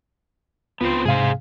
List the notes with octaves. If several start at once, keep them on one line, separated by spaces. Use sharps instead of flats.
C#2 B3 C4 F4 C5
G#2 C3 G#4 C5 F5